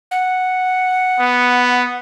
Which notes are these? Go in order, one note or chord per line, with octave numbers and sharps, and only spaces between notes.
F#5
B3